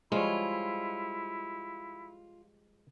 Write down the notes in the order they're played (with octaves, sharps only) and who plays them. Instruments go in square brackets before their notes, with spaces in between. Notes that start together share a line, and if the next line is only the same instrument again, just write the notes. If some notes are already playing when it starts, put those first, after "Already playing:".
[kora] F3 G3 C#5 [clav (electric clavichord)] G#3 [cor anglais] E4 [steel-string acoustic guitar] F4